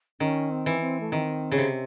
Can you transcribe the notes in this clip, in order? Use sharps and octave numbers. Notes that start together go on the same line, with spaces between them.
D#3 C#4
C4
E3
C4
A3
D#3 C4
C#3
C3